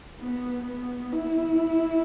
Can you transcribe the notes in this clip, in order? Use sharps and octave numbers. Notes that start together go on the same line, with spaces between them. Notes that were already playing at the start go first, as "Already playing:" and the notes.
B3
B3
E4